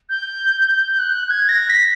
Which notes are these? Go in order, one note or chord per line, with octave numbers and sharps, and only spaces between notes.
G6
G6
F#6
G#6
A#6
B6